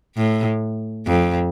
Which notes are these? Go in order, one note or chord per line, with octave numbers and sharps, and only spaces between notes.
A2
F2